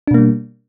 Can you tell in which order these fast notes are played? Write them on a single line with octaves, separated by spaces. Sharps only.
D4 B2 A#3 G3